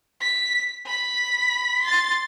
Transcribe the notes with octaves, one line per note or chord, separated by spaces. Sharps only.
B6
B5 B6
C6 A6